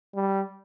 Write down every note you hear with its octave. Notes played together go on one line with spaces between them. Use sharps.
G3